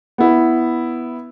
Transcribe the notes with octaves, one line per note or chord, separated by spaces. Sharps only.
B3 E4